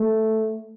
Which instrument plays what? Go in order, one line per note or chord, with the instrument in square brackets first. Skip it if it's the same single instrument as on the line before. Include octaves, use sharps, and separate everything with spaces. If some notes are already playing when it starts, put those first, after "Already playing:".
Already playing: [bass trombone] A3